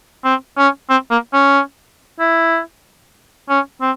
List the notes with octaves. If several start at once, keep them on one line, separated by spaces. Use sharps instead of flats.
C4
C#4
C4
A#3
C#4
E4
C#4
C4